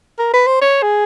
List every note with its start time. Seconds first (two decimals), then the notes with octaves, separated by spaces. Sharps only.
0.19 A#4
0.34 B4
0.47 C5
0.62 C#5
0.83 G#4